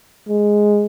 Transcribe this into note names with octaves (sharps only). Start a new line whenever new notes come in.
G#3